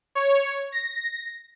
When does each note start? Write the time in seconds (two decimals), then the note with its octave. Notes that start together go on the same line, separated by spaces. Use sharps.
0.15 C#5
0.72 A#6